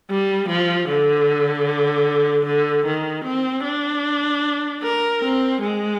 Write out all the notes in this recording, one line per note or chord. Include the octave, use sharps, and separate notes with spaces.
G3
F3
D3
D3
D#3
C4
D4
A#4
C4
G#3